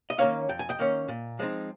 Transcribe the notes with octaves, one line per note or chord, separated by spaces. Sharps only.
D#5
D#3 A#3 C#4 C#5 F5
F2 G5
G#5
D#5 G5
D#3 A#3 C#4
A#2
F3 G#3 C4 D#4